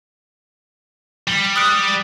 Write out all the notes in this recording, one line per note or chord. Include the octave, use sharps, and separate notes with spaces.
G3
D#6 F#6 D7